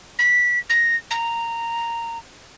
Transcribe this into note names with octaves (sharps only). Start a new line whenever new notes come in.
B6
A#6
A#5